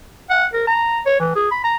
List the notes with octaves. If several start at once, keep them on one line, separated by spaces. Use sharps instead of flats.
F#5
A#4
A#5
C#5
E3
G#4
B5
A#5